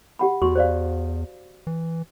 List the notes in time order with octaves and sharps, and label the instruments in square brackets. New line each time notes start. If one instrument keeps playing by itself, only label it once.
[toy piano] G4 F#5 B5
[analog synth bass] E2 [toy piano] F#4 C6 C#6
[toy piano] C5 D5 F5
[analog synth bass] E3